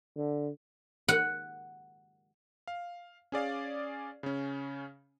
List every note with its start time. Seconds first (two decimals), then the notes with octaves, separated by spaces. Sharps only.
0.16 D3
1.08 F#5
2.68 F5
3.32 C#4 G#4 D5 F5
4.23 C#3 C#4